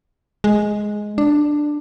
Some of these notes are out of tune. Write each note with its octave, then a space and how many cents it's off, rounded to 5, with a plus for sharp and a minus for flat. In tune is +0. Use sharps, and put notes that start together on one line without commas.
G#3 +5
D4 +10